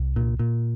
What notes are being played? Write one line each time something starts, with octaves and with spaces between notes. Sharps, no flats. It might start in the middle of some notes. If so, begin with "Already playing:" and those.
Already playing: C2
A#2
A#2